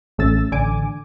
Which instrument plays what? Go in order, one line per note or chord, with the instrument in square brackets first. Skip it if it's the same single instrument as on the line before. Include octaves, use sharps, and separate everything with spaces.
[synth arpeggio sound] A1 A3 C#4 E6 A6
A1 D3 G#5 D6